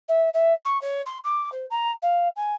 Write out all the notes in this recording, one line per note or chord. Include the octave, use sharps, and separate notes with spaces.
E5
E5
C#6
C#5
C6
D6
C5
A#5
F5
G#5